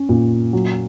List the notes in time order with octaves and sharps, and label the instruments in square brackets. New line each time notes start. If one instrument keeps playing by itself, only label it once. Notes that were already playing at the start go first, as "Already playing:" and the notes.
Already playing: [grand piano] C#4
A#2
F#3